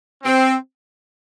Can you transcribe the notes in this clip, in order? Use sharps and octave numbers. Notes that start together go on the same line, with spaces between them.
C4